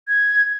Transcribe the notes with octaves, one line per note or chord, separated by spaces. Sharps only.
G#6